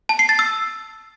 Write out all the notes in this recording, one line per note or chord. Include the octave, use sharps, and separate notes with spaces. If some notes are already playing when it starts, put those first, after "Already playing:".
A5
C7
A6
E6